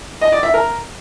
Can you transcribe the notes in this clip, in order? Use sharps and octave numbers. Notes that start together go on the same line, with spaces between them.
D#5
D5
E5
A#4